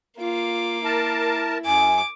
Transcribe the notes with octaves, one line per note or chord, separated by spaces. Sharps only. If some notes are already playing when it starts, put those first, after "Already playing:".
A#3 F4 D6
E4 A#4 A5
F#2 G#5 D6